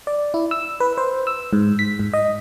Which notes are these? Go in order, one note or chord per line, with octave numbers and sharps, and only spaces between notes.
D5
E4
E6
B4
C5
E6
G#2
B6
G#2
D#5